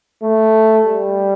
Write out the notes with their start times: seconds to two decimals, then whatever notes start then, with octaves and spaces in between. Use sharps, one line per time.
0.23 A3
0.86 G3